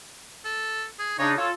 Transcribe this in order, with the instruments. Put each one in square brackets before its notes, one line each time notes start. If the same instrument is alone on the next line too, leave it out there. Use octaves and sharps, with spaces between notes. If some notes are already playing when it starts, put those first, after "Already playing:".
[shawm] A4
G#4
[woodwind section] C#3 D4 D#4 [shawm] C#5
[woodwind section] F4 A4 [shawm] C#5